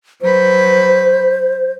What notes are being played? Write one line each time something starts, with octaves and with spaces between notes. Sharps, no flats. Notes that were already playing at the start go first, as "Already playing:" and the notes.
F#3 B4 C5